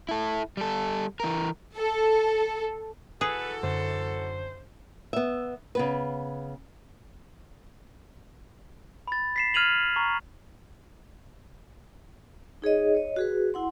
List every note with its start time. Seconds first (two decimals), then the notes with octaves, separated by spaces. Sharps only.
0.09 E4 A4
0.57 G3 A4
1.20 E3 A#4
1.76 A4
3.21 E3 F#4 G#4 A4 B4
3.63 F#2 D3 C5
5.13 B3 E5
5.75 C#3 B3 B4
9.07 B5 A6
9.36 B6 C7 E7
9.54 F6 G#6 D#7 F7 F#7
9.96 A#5 C#6
12.62 D#4 G#4 C#5 D#5
12.95 C#5 D#5
13.16 F#4 G#4 B4
13.54 E4 F#5 C6